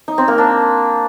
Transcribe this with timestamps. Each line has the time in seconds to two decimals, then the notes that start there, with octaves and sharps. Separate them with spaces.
0.08 D#4
0.18 C4
0.28 A#3
0.38 D4